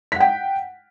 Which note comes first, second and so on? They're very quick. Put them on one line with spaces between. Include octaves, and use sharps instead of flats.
B6 F#5 G5